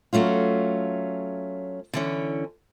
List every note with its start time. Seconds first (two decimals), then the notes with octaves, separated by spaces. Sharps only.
0.13 F#3 A3 C#4 F4
1.94 D3 E3 C#4